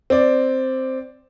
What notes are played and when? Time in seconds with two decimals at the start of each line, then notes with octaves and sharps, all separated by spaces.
0.10 C4 D5